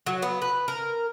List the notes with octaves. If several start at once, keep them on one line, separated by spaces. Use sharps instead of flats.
F#3
B3
B4
A#4